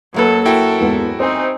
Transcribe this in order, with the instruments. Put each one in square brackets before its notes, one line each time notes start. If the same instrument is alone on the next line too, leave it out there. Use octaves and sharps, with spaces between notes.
[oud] F#2 A#3 B4 [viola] F#3 A4
[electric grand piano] E4 F#4 G5 [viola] A4 A#4
[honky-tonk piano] E2 G#2 B3
[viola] C4 D#4 [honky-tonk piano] C5 G#5